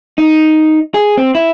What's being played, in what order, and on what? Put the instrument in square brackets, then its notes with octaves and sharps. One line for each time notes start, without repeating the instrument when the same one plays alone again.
[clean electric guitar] D#4
G#4
C4
E4